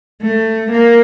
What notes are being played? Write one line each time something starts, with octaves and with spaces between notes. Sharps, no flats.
A3
A#3